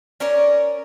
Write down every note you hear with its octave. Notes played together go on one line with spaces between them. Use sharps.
C#4 A#4 C#5 D5